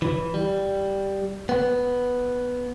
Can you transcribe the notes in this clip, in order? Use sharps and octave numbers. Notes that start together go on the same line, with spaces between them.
E3
G3
B3